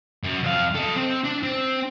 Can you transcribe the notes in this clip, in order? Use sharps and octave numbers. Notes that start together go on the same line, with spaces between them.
F#2
F2 F5
A4 D#5
C4
D4
C4